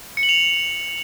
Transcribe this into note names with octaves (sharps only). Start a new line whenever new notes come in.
C#7
F#7
F7